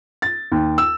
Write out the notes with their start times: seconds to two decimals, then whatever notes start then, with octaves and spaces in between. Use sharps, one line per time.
0.22 A6
0.52 D#2
0.78 E6